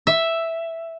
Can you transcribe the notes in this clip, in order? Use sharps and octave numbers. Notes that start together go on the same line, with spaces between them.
E5